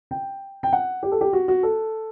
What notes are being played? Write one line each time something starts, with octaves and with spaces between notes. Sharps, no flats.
G5
G5
F#5
G4
A4
G4
F#4
F#4
A4